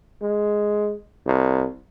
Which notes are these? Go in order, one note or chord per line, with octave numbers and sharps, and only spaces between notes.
G#3
C2